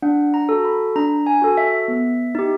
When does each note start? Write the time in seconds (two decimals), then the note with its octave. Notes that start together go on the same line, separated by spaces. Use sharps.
0.02 D4 F#5
0.34 A#5
0.49 F#4 A4
0.65 B5
0.96 D4 A#5
1.27 G#5
1.42 F#4 A4
1.57 E5
1.88 B3
2.35 D#4 G4